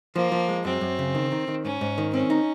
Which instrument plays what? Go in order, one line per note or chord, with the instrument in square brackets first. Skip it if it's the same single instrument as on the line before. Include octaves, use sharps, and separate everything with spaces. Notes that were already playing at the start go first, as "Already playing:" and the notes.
[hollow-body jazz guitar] F3 [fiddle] A#3
[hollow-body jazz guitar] F3
G#3
[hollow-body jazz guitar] F#2 [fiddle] C4
[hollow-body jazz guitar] F#2
C#3
D#3
D#3
D#3
[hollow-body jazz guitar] G#2 [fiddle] C#4
[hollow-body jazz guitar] G#2
D#3
[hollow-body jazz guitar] C4 [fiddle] C#4
[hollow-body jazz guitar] D#4